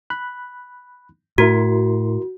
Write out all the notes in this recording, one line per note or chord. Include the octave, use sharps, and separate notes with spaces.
B5 F#6
A2 E4 F#4 A#4 C6